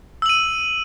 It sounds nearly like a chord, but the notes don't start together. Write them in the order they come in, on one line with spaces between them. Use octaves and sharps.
E6 F#7 D#7